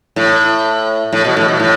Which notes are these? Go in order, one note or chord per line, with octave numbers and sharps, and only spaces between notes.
A2
A2
B2
A2
B2
A2